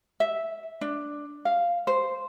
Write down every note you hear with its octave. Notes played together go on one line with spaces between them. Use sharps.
E5
D4
F5
C5